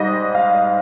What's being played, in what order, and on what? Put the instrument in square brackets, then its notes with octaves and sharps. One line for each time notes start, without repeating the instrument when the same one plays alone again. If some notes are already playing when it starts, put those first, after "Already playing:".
Already playing: [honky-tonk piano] G#2 G3 D#5
F5